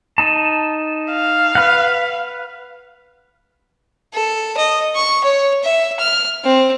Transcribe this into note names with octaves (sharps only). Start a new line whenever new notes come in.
D#4 A5
F5
B4 F#5
A4
D#5
C#6
C#5
E5
F6
C4